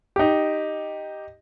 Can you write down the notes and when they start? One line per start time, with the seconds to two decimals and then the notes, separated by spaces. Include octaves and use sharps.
0.16 D#4 G4